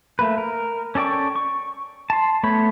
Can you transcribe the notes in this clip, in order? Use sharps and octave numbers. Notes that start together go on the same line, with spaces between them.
A3 A#3 B4
A#4
C#4 A4 D5 G5 C#6
C#6
A5 C6
A3 B3 C#5 B5